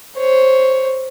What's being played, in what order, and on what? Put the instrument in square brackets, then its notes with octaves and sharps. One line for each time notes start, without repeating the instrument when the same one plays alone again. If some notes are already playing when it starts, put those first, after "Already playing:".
[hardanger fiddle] C5 C#5